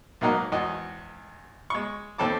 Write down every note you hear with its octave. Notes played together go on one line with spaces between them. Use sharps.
B1 G#2 A#3 F#4 D#5 A#5
G#1 E2 F#4 D#5
G#3 C#6
D#2 C4 A4 A5 D6